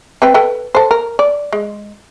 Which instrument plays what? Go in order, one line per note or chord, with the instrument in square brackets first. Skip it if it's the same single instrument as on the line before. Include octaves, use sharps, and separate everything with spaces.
[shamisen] C4 B4 G5
A4 B4 G5
A4 C5
A#4
D5
G#3